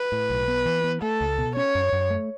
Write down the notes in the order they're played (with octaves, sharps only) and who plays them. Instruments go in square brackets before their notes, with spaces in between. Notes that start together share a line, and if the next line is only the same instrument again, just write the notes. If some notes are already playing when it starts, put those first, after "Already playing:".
Already playing: [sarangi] B4
[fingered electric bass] A2
B1
B3
E3
B3
[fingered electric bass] A3 [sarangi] A4
[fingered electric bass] C#2
B2
[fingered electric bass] C#4 [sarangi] C#5
[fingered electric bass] F#2
F#2
A3